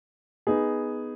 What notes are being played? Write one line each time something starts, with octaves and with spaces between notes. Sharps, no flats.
B3 D#4 G#4